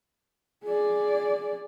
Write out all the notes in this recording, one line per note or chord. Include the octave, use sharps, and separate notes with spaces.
G#4 D5